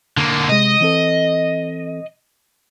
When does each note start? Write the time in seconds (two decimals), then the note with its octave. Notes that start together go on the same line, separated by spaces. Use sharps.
0.17 D3 A#3
0.49 C3 G#3 D#5
0.80 E3 C4 A4